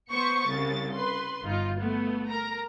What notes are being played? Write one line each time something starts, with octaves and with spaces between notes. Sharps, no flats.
B3 C5 C#6 C#7
C2 C#3 A6
B4 C6
G1 D#4 F4
A3 B3
A#4 A#5